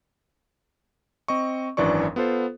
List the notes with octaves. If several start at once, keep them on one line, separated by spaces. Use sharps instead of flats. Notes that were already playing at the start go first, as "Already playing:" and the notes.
C4 D#5 C#6
G#1 F#2 E3 D4 D5 C#6
B3 F4 A4 C5